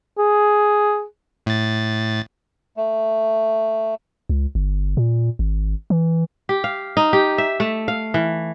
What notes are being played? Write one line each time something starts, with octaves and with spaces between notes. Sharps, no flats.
G#4
A2 A6
A3
C#2
G1
A#2
G#1
E3
G4
F5
D#4
G4
E5
A3
F5
E3